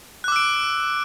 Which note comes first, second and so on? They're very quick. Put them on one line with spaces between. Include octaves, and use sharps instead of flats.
F#6 D6 E6 D7